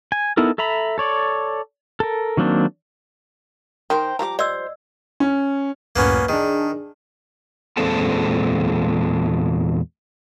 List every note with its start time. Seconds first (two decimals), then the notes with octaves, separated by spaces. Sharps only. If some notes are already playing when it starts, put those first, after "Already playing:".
0.12 G#5
0.37 B3 D#4 E4 A4 A#4
0.58 A4 E5 A#5 B5
0.98 A4 C#5 D5
2.00 A4 A#4
2.37 D#3 F#3 A#3 C4 D4
3.90 D#3 A#4 C5 G5
4.19 F3 G3 G4 A#5 D6
4.39 C5 D5 D#5 E6
5.20 C#4
5.96 C#2 F#2 A2 A#3 B3 C#4
6.29 D#3 D4 G#4
7.77 E2 A#2 G#3 C4 A4 A5